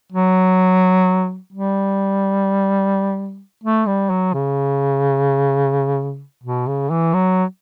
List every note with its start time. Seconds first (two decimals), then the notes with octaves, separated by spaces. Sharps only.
0.12 F#3
1.53 G3
3.64 A3
3.86 G3
4.10 F#3
4.34 C#3
6.44 B2
6.67 C#3
6.90 E3
7.14 F#3